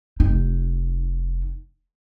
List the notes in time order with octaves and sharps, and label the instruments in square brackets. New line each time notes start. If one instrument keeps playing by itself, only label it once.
[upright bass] F1 D#4